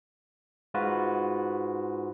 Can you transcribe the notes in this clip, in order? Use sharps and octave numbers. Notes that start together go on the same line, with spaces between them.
G#2 F4 F#4 B4